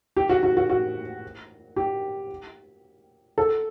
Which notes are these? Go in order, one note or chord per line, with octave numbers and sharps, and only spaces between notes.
G4
F#4
F#4
F#4
F#4
G4
A4